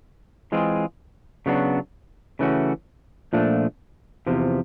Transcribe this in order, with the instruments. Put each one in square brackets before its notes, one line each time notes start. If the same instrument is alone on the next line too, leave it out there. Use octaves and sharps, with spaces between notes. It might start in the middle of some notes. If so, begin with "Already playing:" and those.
[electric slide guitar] E3 G#3 C4 F4 G#4
C#3 F#3 B3 D4 F#4
C#3 E3 A3 C#4 F#4
A#2 F3 A3 D4
E2 C3 F3